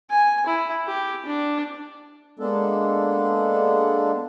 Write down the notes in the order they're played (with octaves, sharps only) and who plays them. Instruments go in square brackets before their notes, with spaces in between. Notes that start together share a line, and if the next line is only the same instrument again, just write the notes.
[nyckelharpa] G#5
E4
G4
D4
[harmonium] G#3 A#3 B3 D4 A4